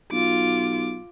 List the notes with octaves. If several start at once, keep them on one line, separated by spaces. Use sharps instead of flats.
B1 F4 D6